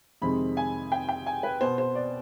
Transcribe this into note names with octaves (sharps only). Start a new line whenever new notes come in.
F2 C3 D#3 G#3 C4 B5
G#5
G5
G5
G#5
B4
B2 B3 C5
C5
D5